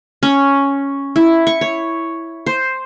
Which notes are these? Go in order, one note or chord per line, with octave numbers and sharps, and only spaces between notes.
C#4
E4
C#6
C#5
C5